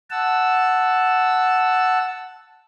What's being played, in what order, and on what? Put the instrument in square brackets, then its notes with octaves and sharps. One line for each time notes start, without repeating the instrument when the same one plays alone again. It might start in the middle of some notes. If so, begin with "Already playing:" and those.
[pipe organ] F#5 A5 E6